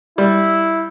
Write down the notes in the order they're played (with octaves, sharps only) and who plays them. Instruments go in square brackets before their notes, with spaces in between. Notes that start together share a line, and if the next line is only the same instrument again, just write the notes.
[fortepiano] G3 [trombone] E4